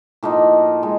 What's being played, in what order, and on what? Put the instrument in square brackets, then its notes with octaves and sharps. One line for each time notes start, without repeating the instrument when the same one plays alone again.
[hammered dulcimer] A2 F3 A#3 D#4
G#3